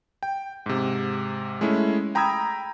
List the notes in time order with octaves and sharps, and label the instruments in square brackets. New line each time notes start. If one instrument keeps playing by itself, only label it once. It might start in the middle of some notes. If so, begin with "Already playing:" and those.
[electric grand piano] G5
G#2 C3
G#3 A3 C#4 E4
G5 A#5 B5 D#6 E6 G#6